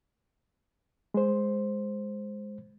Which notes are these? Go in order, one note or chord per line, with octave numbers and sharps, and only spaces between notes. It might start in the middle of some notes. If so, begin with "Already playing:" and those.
G#3 C5